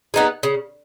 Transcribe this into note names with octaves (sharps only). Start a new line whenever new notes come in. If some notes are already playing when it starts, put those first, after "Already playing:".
B3 D#4 G#4
C#3